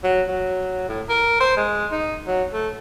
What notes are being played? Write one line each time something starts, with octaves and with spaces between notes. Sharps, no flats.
F#3
F#3
A2
A#4
C5
G#3
D#4
F#3
A3